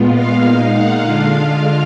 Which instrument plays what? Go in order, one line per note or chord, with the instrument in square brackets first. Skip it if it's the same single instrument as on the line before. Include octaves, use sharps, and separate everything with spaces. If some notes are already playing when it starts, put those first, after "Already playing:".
Already playing: [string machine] A#2 G#3 B3 F4
F5
A#2 G#3 D#4
F#5
D3 G#3 D4 F4 F5